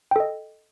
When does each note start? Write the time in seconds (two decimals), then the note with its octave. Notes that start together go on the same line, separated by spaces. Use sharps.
0.11 G5
0.16 A4
0.20 D#5